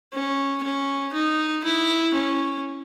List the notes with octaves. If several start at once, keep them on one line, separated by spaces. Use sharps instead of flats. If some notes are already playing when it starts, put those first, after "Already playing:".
C#4
C#4
D#4
E4
C#4